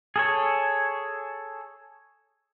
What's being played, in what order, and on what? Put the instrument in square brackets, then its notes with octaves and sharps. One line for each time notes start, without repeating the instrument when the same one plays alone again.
[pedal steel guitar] G#4 A4 C#5